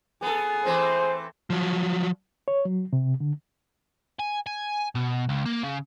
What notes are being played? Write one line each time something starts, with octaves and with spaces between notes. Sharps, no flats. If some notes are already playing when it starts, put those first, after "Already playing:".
B3 G#4 A4
E3 A3 C4 C5
F3 F#3
C#5
F#3
C3
D3
G#5
G#5
B2
C#2
A#3
C#3